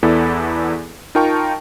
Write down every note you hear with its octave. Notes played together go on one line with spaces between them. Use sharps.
E2 B3 E4 A4 D5
D#4 F4 A#4 G5 A5 C#6